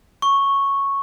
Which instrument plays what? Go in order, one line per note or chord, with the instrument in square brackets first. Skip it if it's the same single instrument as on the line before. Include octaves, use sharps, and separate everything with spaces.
[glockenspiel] C#6